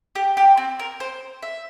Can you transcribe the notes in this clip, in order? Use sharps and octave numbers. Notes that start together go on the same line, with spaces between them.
G4
G4
C4
A#4
C5
E5